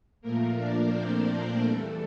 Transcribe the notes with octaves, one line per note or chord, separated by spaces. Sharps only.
A#2 F3 A3 A#3 A#4
D4 D5
C4 C5
A#3 A#4
E2 E3 G3 A3 A4